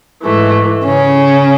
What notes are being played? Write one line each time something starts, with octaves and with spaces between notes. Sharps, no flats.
G#2 E3 A3
C#3 C#4